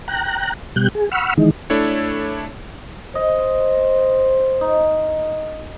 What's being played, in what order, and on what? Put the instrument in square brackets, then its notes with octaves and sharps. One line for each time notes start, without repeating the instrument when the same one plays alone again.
[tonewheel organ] G5 A#5 F#6
B2 G3 F#6 G6
G#4
F#5 B5 C#6 E6 F6
D#3 E3 G#3 D#4
[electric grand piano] A3 D4 E4 A4 C#5
[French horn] C5 [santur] D#5
[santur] D#4